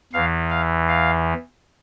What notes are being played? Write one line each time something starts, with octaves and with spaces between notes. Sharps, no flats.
E2 E3 F5
F5
F5